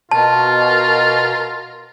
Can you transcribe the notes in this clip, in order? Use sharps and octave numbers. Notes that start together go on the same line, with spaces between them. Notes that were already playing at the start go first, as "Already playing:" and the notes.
B2 F4 A#4 A5